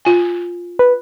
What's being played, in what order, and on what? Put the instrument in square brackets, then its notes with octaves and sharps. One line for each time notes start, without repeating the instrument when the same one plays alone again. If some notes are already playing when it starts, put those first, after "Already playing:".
[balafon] F4 G#5
[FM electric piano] B4